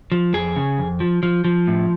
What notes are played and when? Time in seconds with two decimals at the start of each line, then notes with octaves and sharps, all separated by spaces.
0.12 F3
0.34 F2 G#4
0.56 C#3
0.78 F2
1.00 F3
1.23 F3
1.45 F3
1.67 A2